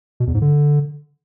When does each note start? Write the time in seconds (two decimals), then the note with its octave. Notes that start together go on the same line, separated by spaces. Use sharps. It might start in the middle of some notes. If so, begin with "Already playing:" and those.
0.20 B2
0.27 E2
0.34 G#2
0.42 D3